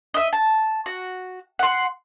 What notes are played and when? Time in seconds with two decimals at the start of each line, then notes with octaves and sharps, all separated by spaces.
0.14 D#5 E5
0.33 A5
0.86 F#4
1.59 F#5 C6